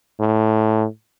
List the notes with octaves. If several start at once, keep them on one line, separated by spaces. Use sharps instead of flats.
A2